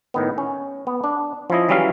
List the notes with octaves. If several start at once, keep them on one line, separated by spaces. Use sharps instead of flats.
A2 D#3 B3
C#4
B3
D4
F3 C#4 E4 D#5
E3 F#3 G3 C#4 E5 F5